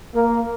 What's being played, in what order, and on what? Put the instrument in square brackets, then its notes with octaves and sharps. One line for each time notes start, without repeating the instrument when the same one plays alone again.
[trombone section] A#3